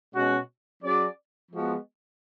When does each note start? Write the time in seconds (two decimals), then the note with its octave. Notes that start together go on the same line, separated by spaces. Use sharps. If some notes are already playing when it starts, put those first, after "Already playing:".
0.13 B2 G#3 C#4 F#4
0.82 F#3 C#4 G#4 D5
1.50 F3 G#3 B3 F#4